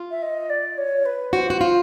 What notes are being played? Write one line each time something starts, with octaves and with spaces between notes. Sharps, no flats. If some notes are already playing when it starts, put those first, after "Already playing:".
Already playing: F4
E5
D#5
D5
C#5
B4
F#4 C5
F#4
F4